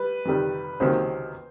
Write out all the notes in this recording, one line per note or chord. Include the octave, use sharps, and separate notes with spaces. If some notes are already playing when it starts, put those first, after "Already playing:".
Already playing: G3 B4
F2 C3 D#3 G3
C#2 C3 D#3 F#3 A#3 C5